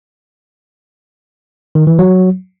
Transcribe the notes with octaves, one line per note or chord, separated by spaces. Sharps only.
D#3
E3
F#3